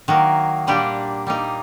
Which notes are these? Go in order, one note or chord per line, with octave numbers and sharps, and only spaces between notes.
D#3 F#3 A#3
A#2 G3 A#3 D4 G4
G3 A#3 D#4